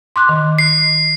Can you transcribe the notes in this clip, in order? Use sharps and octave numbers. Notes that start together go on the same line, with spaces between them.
C6 D6 F#6
D#3
C7